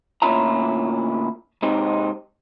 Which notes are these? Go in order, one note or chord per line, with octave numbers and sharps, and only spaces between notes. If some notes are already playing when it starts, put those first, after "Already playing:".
D2 A#2 C#4 E4 F4 A#5
G#2 C3 C4 D#4